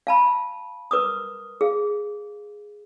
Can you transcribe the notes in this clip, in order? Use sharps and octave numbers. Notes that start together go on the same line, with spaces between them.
F5 A5 B5
A#4 B4 D6 D#6
G#4 F5